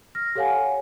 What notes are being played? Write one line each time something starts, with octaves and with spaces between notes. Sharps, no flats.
F6 A#6
G4 A4 C#5 F5 F#5 G#5